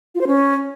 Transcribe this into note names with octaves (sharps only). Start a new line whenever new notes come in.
F4
C5
C#4